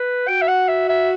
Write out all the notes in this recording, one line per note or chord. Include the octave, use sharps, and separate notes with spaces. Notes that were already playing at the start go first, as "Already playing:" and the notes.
Already playing: B4
F#4 G5
E5
F#5
E5
E5